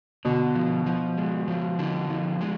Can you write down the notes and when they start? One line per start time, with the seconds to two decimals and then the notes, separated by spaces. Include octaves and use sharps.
0.25 B2 D3
0.55 F3
0.86 F3
1.18 G#3
1.48 F3
1.79 D3
2.10 F3
2.41 G#3